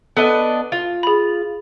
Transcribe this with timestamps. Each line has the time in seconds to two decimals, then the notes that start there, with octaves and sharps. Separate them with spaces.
0.17 B3 D4 A4 D#5
0.72 F4
1.03 G#4 B5